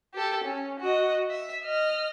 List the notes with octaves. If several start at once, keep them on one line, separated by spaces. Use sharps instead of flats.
G4 A4
C#4
F#4 D#5
E5
D#5 F6